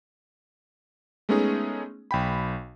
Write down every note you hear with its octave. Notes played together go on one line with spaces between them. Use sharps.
G#3 A3 B3 C#4 D#4 G#4
B1 G5 B5